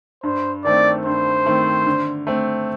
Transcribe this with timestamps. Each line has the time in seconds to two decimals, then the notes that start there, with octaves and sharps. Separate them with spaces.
0.23 G2 C5
0.64 D#3 A3 C4 D5
1.05 G2 C5
1.46 D#3 A3 C4
1.86 D3
2.27 A3 C4